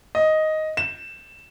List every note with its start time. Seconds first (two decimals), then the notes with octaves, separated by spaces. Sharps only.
0.15 D#5
0.77 E7